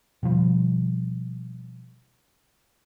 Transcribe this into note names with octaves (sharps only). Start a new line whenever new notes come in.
B2 D3 F3 G3